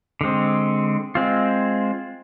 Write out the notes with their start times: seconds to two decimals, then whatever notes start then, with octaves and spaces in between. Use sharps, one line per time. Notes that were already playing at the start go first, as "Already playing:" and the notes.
0.21 D3 G#3 C4
1.15 G#3 C4 F4